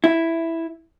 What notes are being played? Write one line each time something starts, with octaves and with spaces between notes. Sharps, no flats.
E4